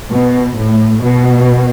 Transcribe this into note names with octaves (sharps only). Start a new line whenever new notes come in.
B2
A2
B2